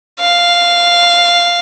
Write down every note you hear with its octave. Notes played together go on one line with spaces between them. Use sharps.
F5